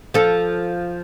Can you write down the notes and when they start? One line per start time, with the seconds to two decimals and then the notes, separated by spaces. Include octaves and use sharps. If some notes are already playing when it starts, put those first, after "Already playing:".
0.14 F3 A4